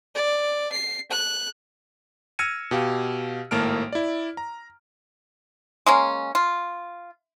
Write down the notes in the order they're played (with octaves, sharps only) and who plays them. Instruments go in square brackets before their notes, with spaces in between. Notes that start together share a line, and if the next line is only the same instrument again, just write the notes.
[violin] D5
C7
F#6
[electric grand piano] E6 F6 G#6 A#6 C#7 D#7
B2 G4 F5
G#1 A2 A#3 A5 F6 D7
E4 D5
A#5
[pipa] G#3 A#3 C#4
F4